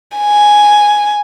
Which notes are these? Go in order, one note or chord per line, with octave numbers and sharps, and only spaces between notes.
G#5